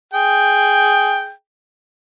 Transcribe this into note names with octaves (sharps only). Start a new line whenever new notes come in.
G#4 G5